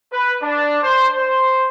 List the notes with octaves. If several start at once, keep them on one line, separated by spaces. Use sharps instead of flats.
B4
D4
C5
C5